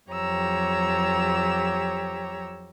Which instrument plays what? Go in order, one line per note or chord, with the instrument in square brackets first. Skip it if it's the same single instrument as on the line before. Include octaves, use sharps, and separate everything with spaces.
[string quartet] F2 F#3 G4 C#5 A#5 E6